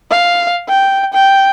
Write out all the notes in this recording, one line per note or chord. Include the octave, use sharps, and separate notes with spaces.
F5
G5
G5